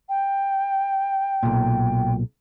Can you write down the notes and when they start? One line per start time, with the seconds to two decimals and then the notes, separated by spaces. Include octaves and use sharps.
0.08 G5
1.43 B1 A#2